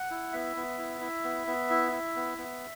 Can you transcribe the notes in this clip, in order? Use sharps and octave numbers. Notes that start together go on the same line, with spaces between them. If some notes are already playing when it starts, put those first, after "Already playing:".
Already playing: F#5
E4
B3 E5
B3
E4
E4
B3
B3
E4
E4
B3
B3